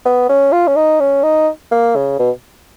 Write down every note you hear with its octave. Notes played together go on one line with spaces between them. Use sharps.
B3
C#4
F4
C#4
D#4
C#4
D#4
A#3
C#3
B2